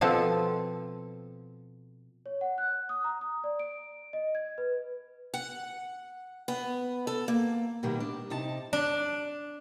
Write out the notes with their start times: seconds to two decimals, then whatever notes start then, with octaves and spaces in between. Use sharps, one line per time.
0.01 B2 F3 C4 A4
2.26 C#5
2.41 F#5
2.58 F#6
2.89 D#6
3.04 A#5
3.21 D#6
3.44 D5
3.60 D7
4.13 D#5
4.35 G#6
4.58 B4
5.34 F#5
6.48 B3
7.07 A4
7.28 A#3
7.83 B2 D#3 G3 A#3
8.00 D4
8.30 C3 D#4 A5
8.73 D4